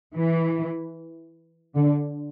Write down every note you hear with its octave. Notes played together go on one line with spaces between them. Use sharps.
E3
D3